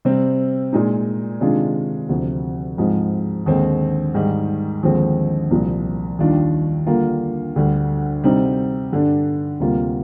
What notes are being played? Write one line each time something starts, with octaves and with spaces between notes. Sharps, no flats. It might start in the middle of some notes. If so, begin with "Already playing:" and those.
C3 G3 C4
A#2 G#3 D#4
C3 D#3 G#3 D4 F4
D2 C3 F3
G#2 F3 G#3 C4
D#2 D3 G#3 C4
G#2 D#3 G3
D#2 D3 F3 G#3 C4
C2 A#2 F3
D#2 D#3 G3 D4 F4
D3 G3 A#3 F4
D2 D3 G3
C3 G3 C4 D#4
G2 D3 G3 D4
D2 C3 G3 A#3 F4